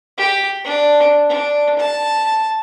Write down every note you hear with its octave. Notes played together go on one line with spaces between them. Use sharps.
G4
D4
D4
A5